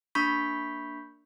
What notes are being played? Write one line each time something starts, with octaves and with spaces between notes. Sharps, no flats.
A#3 D4 B5 C#6 G6 B6